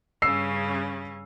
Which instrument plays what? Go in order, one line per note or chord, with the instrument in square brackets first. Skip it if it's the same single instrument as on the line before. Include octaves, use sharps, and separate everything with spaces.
[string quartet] G2 C#3 C#4 [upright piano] E6 C7